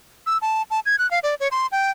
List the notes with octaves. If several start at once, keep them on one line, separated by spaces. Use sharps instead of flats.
E6
A5
A5
G#6
F#6
F5
D5
C#5
C6
G5